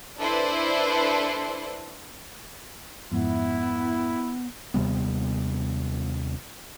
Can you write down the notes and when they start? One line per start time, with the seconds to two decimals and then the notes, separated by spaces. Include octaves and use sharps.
0.18 D4 E4 A4 B4 C5
3.12 F2 G#2 B3 E4
4.74 D#2 C3 G3 B3